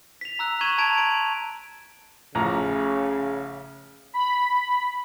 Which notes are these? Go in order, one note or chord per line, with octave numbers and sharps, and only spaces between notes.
B6 F7
A#5 E6 F#6
C#6 G#6 D#7 E7 F#7
A5 A#5 G#6 D7 F7
C6 D7
A1 C#3 F3 A#5
B5